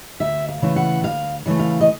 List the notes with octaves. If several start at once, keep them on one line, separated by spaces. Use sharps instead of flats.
D2 E5
F5
C#3 E3 A3
F#5
D2 F5
C#3 E3 A3
F5
D#5